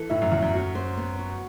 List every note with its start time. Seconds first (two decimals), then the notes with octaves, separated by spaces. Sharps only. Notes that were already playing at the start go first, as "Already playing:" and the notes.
Already playing: E3 A4
0.10 A2 E5
0.21 F#2
0.32 E2 F#4
0.42 F#2
0.54 F#4
0.75 C5
0.97 B3
1.19 F#4